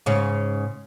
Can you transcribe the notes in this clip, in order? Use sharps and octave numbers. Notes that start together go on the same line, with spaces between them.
G#2 C#3